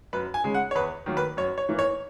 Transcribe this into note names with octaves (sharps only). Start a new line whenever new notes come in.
F#2 B4
G#5
C#3 G#3
F#5
C#5
E2 B4
D#3 F#3 A#3
B4
F#2 C#5
C#5
E3 A#3
C#5